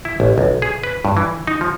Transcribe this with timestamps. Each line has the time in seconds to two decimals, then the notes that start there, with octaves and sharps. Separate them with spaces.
0.05 E4
0.20 A1
0.38 B1
0.62 G#4
0.84 B4
1.05 G2
1.17 E3
1.47 D#4
1.61 F3